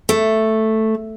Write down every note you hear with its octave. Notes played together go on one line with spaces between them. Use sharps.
A3